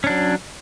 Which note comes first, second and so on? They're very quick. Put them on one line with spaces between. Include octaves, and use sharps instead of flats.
C#4 D4 F#3